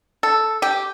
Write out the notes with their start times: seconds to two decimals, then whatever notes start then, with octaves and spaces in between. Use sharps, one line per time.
0.23 A4
0.62 G4